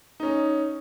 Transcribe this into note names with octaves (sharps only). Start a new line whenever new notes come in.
C#4 D#4